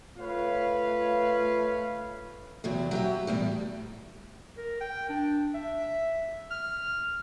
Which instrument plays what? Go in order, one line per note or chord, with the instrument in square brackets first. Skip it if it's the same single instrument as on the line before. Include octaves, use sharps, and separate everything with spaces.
[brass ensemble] A3 F4 B4 C#5 F5
[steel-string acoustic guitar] E2 C3 F#3
F#3 G4 E5
E2 A2 G3
[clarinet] A#4
G5
D4
E5
F6